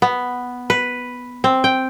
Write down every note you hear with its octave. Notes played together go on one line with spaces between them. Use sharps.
B3
B4
C4
G5